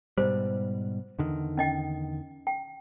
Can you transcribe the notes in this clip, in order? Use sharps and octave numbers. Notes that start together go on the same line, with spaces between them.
G#2 B2 G3 C5
E2 D3 D#3
C#4 D#5 G5
G5